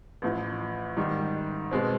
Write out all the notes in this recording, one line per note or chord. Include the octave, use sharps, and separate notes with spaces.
A1 A2 F3
G#2 D#3 G3
B2 G#3 C4